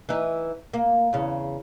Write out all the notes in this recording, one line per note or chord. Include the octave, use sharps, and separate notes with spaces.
E3 D#4
A#3
E2 C#3